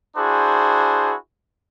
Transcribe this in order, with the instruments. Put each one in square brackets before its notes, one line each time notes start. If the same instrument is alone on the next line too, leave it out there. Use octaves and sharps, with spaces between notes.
[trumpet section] D4 E4 F#4 G#4 C5